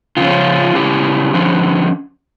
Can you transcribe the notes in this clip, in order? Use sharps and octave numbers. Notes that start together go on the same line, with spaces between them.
C#3 F3 C#4 F4
C#3 F3 C#4 E4 G4
D3 F3 C#4